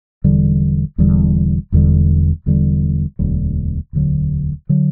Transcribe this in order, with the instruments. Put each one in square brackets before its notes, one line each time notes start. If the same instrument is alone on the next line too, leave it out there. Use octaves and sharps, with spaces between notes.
[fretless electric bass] E1 E2 D3 G3
E1 E2 D3 G3
E1 E2 D3 G3
E1 E2 D3 G3
E1 D2 D3 F#3
E1 D2 D3 F#3
D3 F#3